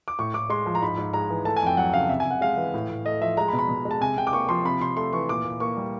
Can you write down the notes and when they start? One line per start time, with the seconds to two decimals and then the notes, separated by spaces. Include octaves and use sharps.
0.08 D6
0.19 A2 C#6
0.34 A2 D6
0.50 G#3 C6
0.66 F3
0.75 A#5
0.82 G#2 B5
0.97 G#2
1.13 G#3 A#5
1.30 E3
1.45 A3 A5
1.57 G#5
1.62 F2 G5
1.77 F#3 F#5
1.94 C#3 F5
2.09 C3 E5
2.20 G#5
2.26 C3 F#5
2.41 G#3 F5
2.57 E3
2.74 A2
2.89 A2
3.06 A3 D#5
3.22 F3 E5
3.37 G#3 A#5
3.48 B5
3.53 B2
3.59 B5
3.69 B2
3.85 G#3
3.91 A5
4.01 C3 G#5
4.17 C3 G5
4.27 D6
4.33 A#3 C#6
4.49 F3 C6
4.65 C3 B5
4.81 C3 C6
4.97 A3 C6
5.13 E3 C#6
5.29 A#2 D6
5.44 A#2
5.60 A#3 C#6
5.77 G3